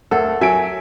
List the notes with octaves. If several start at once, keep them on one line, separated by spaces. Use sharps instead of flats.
D2 A4 A#4 F#5
F#3 E5 G#5 D7